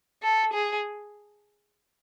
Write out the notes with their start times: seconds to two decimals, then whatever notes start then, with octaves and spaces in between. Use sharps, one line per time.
0.22 A4
0.54 G#4